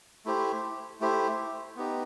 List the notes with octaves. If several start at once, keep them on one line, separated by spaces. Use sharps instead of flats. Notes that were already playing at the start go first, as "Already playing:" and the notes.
A3 E4 G4 C5
A3 E4 G4 C5
B3 D#4 G4